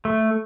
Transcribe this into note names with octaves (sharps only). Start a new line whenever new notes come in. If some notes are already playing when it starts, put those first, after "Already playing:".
A3